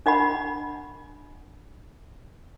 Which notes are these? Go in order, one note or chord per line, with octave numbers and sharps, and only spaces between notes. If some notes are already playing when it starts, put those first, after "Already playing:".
D4 D#5 F#5 B5